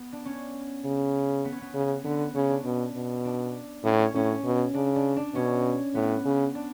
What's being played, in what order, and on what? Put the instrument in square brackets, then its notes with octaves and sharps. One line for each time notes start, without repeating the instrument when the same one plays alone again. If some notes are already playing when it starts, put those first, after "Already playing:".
Already playing: [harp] B3
D4
C#4
[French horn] C#3
[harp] B3
C#4
B3
[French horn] C#3
[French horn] D3 [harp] B3
[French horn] C#3 [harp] C#4
[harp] D4
[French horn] B2
B2
[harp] D4
[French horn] A2 [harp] C#4
[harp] C#4
[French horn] A2 [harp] C#4
[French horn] B2
[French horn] C#3 [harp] D4
[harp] D4
D4
[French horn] B2 [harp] C#4
[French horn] A2 [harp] B3
[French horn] C#3
[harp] D4